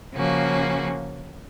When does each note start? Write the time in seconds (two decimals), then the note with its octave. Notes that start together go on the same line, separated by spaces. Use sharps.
0.14 C#3 F3 A#3 C#4 F#4